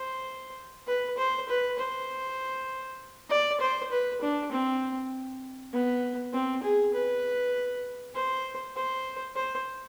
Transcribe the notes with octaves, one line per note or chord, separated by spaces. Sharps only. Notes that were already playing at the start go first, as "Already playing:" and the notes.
Already playing: C5
B4
C5
B4
C5
D5
C5
B4
D4
C4
B3
C4
G#4
B4
C5
C5
C5